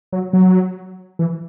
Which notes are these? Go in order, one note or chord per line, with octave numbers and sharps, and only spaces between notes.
F#3
F#3
E3